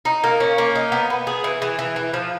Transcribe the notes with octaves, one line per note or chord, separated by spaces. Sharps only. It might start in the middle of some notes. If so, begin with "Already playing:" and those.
D#4
A#3
C#4
A#3
D#4
B3
B3
G#4
E3
E3
E3
E3
F3